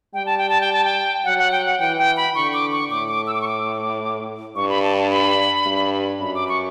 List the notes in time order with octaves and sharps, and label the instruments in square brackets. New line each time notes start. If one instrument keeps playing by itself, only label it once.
[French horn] G3 [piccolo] G5
[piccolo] A5
G5
A5
G5
A5
G5
[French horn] F#3 [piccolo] F#5
[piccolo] F#5
G5
F#5
[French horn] E3 [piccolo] G5
[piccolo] G5
B5
[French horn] D3 [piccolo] C#6
[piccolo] D6
C#6
[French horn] A2 [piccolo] D6
[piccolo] D6
E6
D6
C#6
D6
[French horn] G2 [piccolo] C#6
[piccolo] B5
A5
A5
B5
[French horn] G2
[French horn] F#2 [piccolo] B5
[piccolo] D6
C#6